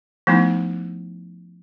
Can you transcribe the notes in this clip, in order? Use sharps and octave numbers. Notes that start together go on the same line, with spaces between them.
F3 A3 B3 D#4 E4